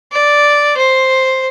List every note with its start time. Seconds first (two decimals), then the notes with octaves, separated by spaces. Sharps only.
0.12 D5
0.77 C5